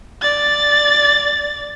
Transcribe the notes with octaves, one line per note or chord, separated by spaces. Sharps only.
D5 A6